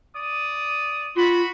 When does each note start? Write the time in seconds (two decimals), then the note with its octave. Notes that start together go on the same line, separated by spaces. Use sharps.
0.15 D5 D#6
1.16 F4 F#4 B5